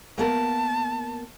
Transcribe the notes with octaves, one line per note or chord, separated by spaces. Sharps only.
A#3 B3 A#4 A5